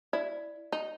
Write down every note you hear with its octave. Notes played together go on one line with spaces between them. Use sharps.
E4 D5
D#4